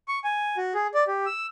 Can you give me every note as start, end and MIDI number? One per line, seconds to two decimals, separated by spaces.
0.08 0.19 85
0.24 0.57 80
0.57 0.73 66
0.75 0.87 68
0.94 1.04 74
1.07 1.26 67
1.26 1.46 88